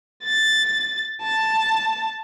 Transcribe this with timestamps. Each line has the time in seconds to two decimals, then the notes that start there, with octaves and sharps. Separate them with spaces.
0.24 A6
1.22 A5